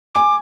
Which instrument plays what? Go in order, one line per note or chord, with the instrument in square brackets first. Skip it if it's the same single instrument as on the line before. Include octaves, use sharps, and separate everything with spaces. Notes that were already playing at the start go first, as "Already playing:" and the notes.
[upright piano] G#5 [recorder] D6